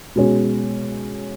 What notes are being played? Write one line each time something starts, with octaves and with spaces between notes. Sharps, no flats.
B2 G#3 C#4